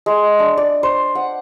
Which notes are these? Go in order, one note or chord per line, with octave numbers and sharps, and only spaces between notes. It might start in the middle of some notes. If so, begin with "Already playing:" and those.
G#3
D4
D5
C5
F#5